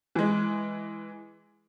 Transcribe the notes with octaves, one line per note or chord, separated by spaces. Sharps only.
E3 G#3